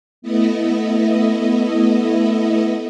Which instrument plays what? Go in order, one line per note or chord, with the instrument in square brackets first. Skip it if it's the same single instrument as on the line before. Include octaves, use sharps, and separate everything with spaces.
[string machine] A3 B3 E4 D#5